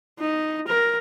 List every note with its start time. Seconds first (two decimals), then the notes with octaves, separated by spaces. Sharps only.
0.19 D#4
0.68 A#4